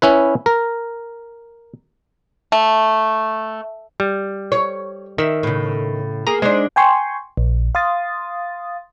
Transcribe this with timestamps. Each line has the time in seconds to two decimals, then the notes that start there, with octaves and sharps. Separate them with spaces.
0.02 C#4 E4 B4
0.46 A#4
2.52 A3
4.00 G3
4.52 C#5
5.18 D#3 E5
5.43 A2 C#3
6.27 A#3 G#4 A#5
6.42 G#3 D4 D#4 C5
6.76 G5 G#5 C6 C#6
7.37 A#1
7.75 F5 C6 D#6 A6